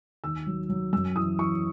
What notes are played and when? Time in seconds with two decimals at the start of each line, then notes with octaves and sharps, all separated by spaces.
0.24 D#2 E6
0.47 F#3
0.69 F#3
0.93 F#2 E6
1.15 E3 D#6
1.39 E3 C#6